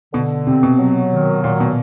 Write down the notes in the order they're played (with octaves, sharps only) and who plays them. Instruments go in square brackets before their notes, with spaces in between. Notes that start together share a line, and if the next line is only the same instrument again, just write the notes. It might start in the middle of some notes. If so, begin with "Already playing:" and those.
[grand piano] B2 [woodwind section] D3
[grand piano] C3 [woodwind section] C4
[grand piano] B2
[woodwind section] F#3
D#3
[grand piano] A#2 [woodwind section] F#3
[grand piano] B2